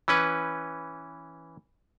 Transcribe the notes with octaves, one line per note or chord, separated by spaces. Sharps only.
E3 C#4 B4